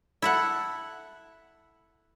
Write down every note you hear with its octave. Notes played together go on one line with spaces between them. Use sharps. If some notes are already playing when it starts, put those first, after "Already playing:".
E4 A4 F#5